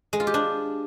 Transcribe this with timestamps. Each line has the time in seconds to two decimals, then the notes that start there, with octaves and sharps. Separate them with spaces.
0.13 G#3
0.20 F4
0.27 G4
0.34 D4